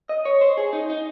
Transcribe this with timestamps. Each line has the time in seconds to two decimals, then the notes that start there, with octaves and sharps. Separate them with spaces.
0.09 D#5
0.25 C#5
0.41 C5
0.57 G#4
0.73 D#4
0.90 D#4